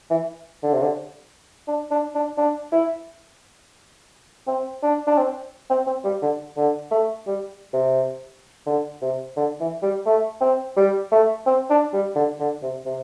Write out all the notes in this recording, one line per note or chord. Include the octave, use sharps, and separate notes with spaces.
E3
D3
C3
D3
D4
D4
D4
D4
E4
C4
D4
D4
C4
C4
C4
G3
D3
D3
A3
G3
C3
D3
C3
D3
E3
G3
A3
C4
G3
A3
C4
D4
G3
D3
D3
C3
C3